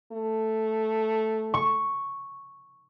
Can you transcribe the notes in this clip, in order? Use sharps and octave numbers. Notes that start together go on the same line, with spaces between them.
A3
C#6